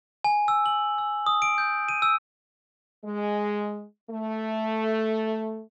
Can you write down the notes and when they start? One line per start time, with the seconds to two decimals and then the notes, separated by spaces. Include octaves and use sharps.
0.24 G#5
0.48 E6
0.66 F#7
0.98 E6
1.27 D#6
1.42 D7
1.58 G6
1.88 D#7
2.02 E6
3.05 G#3
4.11 A3